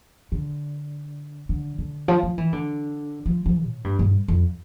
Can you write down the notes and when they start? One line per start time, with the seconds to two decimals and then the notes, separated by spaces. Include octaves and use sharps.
0.32 D3
1.49 D3
1.78 D3
2.08 F3
2.23 F3
2.38 E3
2.53 D3
3.26 F3
3.46 F3
3.65 A2
3.84 G2
3.99 G2
4.28 F2